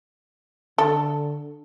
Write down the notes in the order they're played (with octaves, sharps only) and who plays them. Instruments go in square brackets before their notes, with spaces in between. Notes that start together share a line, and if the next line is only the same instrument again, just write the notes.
[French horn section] D3 [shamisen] A4